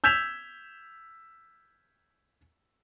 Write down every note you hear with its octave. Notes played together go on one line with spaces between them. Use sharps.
E6 G6 G#6 B6 E7 F7